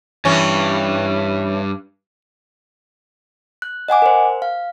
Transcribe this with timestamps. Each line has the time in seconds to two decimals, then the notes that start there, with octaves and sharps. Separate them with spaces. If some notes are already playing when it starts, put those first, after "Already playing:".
0.25 G2 E3 C#4
3.62 F#6
3.88 D#5 F#5 G#5 D6
4.02 A#4 C5
4.42 F5